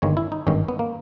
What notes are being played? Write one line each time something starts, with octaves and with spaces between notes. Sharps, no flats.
G1 G2 D#3 G#3 C#5
E4
D#4
G#1 G2 D#3 G#3 C#4
B3
A#3